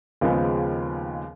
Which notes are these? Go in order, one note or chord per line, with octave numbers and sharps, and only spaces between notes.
D#2 C#3 F3 G#3 B3